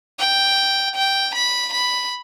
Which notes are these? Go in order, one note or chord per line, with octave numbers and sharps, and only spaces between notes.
G5
G5
B5
B5